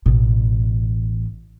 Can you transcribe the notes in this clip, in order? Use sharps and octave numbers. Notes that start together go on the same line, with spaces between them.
A1 B2